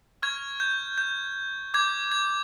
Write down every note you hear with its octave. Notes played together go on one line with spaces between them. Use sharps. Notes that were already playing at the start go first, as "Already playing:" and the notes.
C#6 F6 G#6
G6
G6
D6 G6 G#6
G#6